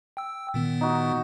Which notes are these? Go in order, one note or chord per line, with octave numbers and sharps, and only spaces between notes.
G5 E6
A#2 D#3 B3
D#4 F#4